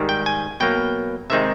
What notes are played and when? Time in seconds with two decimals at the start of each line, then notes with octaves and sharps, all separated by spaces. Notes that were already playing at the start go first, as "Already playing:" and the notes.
Already playing: G#2 D#3 G3
0.09 G5
0.26 G#5
0.60 B2 F#3 A#3 G5
1.30 C3 D#3 G#3 C4 D#4 E5